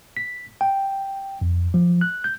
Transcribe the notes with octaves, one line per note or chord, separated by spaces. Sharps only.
B6
G5
F2
F3
F#6
G6